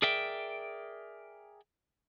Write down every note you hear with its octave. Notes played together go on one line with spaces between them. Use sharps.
G#4 A#4 D5 E5 G5